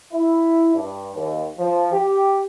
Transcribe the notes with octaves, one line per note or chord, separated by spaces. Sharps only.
E4
G2
D#2
F3
G4